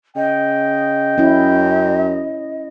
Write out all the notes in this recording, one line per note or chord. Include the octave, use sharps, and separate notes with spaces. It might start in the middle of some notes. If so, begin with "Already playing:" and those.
C#3 D#5 G5
F#2 C#4 E4